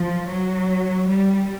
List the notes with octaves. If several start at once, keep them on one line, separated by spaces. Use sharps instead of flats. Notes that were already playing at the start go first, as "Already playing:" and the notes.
Already playing: F3
F#3
G3